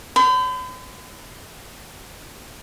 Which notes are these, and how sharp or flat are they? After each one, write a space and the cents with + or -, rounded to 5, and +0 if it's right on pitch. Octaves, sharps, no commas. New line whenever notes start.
C#5 +10 G5 +0 B5 +45